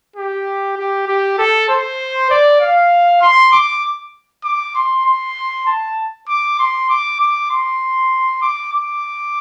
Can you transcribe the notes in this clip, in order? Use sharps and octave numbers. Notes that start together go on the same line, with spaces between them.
G4
G4
G4
A4
C5
D5
F5
C6
D6
D6
C6
C6
A5
D6
C6
D6
D6
C6
D6
D6